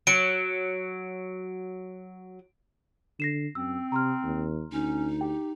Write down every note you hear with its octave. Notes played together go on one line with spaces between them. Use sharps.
F#3 D7
D3 A#6 C7 E7
F#2 C4 E6
C3 A#5 C6 F6
D#2
D2 C#4 D#4
G4 G5